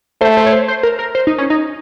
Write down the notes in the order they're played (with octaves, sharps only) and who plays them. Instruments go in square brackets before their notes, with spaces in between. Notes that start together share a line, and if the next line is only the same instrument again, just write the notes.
[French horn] A3 [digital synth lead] C5
[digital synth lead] C5
C#5
C5
C5
A#4
A#4
C5
D#4
C#4
D#4